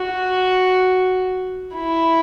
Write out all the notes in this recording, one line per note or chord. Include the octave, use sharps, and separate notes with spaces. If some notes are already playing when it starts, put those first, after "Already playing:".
Already playing: F#4
E4